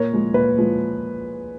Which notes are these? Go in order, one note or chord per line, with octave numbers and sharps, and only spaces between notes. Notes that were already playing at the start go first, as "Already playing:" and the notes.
Already playing: A#2 A#4 C#5
F3 G#3
A#2 B4
F3 G#3